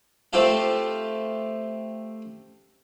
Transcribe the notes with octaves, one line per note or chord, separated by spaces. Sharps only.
A3 C4 F4 G4 A4 F5